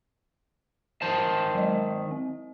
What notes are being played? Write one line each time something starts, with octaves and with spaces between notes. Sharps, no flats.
D#3 C5 A5
F#3 G#3 D#5
C4